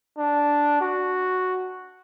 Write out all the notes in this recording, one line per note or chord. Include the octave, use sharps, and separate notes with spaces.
D4
F#4